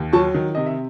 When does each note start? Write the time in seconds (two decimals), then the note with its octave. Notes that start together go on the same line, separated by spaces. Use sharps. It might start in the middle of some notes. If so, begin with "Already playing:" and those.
Already playing: D#2
0.13 F#3 A5 C#6
0.34 D#3
0.55 C3 D#5
0.66 E5